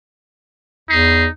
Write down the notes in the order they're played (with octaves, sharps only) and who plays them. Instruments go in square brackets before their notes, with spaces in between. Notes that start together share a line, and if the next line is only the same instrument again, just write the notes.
[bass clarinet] E2 [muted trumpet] D#4 [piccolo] C7